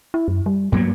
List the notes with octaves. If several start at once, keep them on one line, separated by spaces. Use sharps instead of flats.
E4
F#2
G3
G2 F#3 A#3 B3